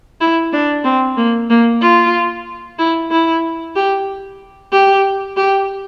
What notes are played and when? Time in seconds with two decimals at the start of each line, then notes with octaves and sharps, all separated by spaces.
0.21 E4
0.53 D4
0.85 C4
1.17 A#3
1.50 A#3
1.82 F4
2.79 E4
3.11 E4
3.76 G4
4.72 G4
5.37 G4